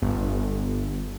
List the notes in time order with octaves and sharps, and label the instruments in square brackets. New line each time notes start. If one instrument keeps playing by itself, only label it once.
[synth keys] G1